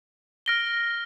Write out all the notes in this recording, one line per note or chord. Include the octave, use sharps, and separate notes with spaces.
F6 A#6 D7 G7